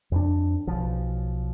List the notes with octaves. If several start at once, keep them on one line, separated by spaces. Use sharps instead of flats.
F2 D4
B1 F3